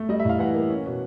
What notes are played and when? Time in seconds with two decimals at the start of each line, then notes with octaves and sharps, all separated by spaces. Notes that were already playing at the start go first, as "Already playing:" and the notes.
Already playing: A3
0.09 G3 D#5
0.20 E5
0.25 A2 F5
0.39 E3 F#5
0.54 A#3
0.70 C#4
0.86 B2